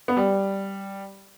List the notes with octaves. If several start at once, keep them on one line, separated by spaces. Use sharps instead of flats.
B3
G3